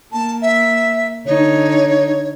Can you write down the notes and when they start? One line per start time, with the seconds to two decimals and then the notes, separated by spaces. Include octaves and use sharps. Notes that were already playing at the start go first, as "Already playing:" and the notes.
0.12 A#3 A5
0.42 E5
1.26 D3 D#4 C#5